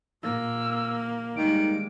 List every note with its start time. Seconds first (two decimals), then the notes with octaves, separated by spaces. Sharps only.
0.23 A#2 A#3 E6
1.36 D#3 G3 G#3 D7